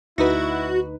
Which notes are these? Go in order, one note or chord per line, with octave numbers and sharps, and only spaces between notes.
D2 D#4 E4 F#4 B4